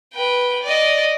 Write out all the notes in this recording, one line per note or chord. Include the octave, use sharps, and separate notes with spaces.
B4 G5
D5 D#5